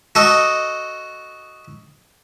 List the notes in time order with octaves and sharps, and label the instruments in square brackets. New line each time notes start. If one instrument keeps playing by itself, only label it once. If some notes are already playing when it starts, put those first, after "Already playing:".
[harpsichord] F#4 A4 D#5